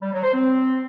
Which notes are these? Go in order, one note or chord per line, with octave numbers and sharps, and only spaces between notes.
G3
F#3
C5
C4